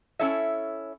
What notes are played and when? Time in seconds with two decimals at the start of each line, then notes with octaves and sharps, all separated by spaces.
0.19 C#4 E4 A4 C#5 E5